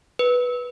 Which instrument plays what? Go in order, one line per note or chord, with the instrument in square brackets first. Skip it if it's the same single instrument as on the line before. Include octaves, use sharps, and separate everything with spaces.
[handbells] B4